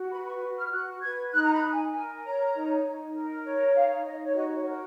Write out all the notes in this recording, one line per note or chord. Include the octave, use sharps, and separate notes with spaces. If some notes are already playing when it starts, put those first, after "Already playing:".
Already playing: F#4
B4 B5
C#6
F#4
F6
F#4 F#6
B4 G#6
D#4 F#6
A#5
B5
D#4
G#5
A#4 G#5
C#5 A#5
D#4
D#4
A#4
C#5
D#4 F5
D#4 D#5
C#5
F#4 D#5
C#5
A#4